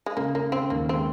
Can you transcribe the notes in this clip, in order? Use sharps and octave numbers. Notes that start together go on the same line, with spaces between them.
G#3
C#3 A#3
C#3 A#3
C#3 C4
D#2 A#3
G#3 C4